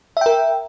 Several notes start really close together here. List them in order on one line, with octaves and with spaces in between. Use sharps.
E5 G5 A#4